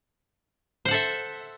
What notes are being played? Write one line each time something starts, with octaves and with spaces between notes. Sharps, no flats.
A4 C5 E5 F#5